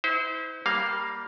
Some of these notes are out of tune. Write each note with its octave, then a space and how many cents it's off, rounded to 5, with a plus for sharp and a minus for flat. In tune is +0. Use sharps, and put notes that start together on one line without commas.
E4 -40 C5 -30
G3 +0 A#3 +0 F5 +0